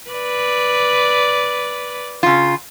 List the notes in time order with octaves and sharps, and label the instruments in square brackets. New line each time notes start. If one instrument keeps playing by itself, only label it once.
[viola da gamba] B4 D5
[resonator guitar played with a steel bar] C#3 F4